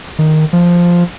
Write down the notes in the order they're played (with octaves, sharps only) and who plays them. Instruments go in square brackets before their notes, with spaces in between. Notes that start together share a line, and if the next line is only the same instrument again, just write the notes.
[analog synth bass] D#3
F3